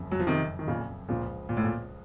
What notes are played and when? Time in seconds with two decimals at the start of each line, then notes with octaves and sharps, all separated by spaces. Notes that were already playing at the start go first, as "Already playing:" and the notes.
Already playing: F#1 F2 C#3
0.11 F#3
0.20 F3
0.27 C3 D#3
0.59 D#3
0.68 A#2 C#3
1.09 C#2 A#2 C#3 F3
1.49 A#2
1.57 A2
1.64 A#2